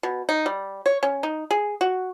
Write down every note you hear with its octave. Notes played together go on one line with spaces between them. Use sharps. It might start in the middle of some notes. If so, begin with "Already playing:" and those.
B2
D#4
G3
C#5
C#4
D#4
G#4
F#4